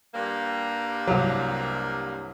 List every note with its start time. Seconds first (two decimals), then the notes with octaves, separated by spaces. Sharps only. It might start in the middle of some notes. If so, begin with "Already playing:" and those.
0.14 G2 G3 A#3
1.07 C2 F#3